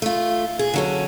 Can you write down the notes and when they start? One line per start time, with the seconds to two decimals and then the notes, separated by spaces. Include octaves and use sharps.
0.02 A3 F4
0.59 G#4
0.73 D3 F#3 C#4